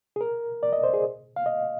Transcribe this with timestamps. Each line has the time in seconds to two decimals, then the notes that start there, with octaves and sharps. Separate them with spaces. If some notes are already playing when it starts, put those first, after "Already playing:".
0.16 G#4
0.21 A#4
0.63 D5
0.73 D#5
0.84 C5
0.94 G#4
1.36 F5
1.46 D#5